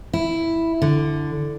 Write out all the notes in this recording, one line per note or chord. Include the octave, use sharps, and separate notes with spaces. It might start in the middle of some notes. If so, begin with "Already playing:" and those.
E4
D3